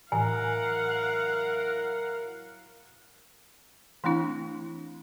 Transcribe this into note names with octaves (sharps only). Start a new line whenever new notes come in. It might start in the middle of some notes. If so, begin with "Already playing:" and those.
A2 E3 F#3 E4 A#4 F5 F#5 G#5
E3 A3 C4 D4 E4